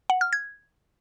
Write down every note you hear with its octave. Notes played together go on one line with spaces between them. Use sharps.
F#5
F6
G#6